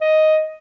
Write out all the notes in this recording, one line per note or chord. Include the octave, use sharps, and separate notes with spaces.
D#5